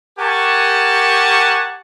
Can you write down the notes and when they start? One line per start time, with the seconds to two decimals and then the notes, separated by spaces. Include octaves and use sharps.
0.19 G4 A#4 F#5 G#5 A5 C#6